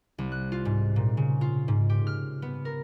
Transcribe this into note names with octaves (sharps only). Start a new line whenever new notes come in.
C2
F#6
F4
G#2
A#2
C#3
F4
G#2
G4
F6
B3
A#4